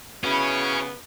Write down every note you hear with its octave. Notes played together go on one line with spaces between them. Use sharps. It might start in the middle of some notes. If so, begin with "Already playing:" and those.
C#3 B3 C#4 E4 F#4